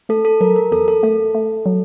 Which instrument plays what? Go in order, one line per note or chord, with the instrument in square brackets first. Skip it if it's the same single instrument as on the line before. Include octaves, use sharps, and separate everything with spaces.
[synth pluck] A3 [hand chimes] A4
[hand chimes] A4
[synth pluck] F#3 [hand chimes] A#4
[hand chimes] A#4
[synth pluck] E2 [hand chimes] A4
[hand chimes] A4
[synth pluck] A3 [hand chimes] A4
[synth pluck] A3
F#3